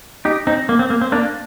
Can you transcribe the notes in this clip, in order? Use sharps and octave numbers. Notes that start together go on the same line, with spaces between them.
D#4 G4
C4 D#4
A#3
C4
A#3
C4
A#3 D4